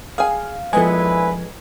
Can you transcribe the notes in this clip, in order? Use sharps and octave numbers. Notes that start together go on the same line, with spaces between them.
G#4 F5 G#5
A#1 F3 G#3 B3 E4 A4 B4 G#5